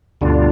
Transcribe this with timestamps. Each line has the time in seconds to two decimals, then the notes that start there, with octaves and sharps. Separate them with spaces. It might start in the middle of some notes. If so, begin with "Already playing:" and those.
0.21 D2 G2 B2 D3 G3 D4 F4